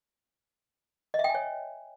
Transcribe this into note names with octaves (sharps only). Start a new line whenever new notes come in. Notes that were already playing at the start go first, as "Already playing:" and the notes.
D#5
E5
G5
G#5
C#5